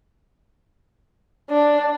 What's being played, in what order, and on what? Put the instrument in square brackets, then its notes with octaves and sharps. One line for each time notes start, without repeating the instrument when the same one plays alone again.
[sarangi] D4